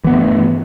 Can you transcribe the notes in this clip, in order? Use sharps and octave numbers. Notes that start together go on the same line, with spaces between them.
G2 E3 A3 B3